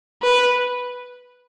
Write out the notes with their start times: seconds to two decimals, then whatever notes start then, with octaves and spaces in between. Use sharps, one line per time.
0.22 B4